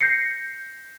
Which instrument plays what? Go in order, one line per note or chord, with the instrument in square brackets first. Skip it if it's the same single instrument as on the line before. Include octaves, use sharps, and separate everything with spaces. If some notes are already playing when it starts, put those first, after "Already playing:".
[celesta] G6 A#6 C7 C#7